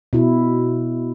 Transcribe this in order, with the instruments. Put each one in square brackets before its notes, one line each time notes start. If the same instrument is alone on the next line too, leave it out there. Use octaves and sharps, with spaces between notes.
[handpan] B2 E4